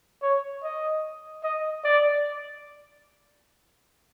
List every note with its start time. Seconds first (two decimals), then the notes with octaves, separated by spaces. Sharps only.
0.22 C#5
0.63 D#5
1.43 D#5
1.84 D5